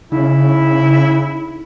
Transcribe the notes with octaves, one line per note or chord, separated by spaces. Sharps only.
C#3 D#4 E4